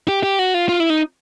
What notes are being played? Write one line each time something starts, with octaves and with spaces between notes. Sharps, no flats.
G4
G4
F#4
F4
F4
E4
D#4